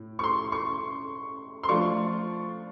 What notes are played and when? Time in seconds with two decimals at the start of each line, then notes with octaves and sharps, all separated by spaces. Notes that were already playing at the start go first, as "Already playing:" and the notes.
Already playing: A2
0.19 C#6
0.24 C6
0.52 C#6
1.63 C6
1.69 F3 A3 D4 F4 C#6